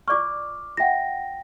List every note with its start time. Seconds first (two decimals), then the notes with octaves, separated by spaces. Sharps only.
0.08 F4 D5 C#6 D6 F6
0.77 F4 E5 F#5 G5 A#6